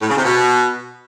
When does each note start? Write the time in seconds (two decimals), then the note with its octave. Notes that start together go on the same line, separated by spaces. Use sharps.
0.02 A2
0.10 C#3
0.17 C3
0.25 B2